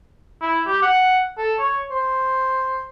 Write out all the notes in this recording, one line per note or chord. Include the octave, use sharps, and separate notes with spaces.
E4
G4
F#5
A4
C#5
C5